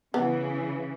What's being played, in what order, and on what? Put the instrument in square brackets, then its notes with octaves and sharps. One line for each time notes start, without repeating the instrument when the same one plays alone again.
[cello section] C#3 E3 [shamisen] B3